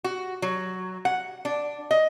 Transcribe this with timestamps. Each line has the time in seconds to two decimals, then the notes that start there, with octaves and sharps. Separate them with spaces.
0.04 F#4
0.42 F#3
1.05 F#5
1.45 D4
1.91 D#5